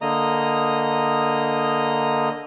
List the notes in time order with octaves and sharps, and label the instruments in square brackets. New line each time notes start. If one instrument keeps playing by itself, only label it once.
[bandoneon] D3 A#3 D#5 A#5 D#6